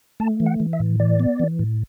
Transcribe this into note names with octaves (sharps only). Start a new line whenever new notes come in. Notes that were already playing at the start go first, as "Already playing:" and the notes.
A3 A5
E3
F#5
E3
E5
A2
E3 D5
B3
E3
A2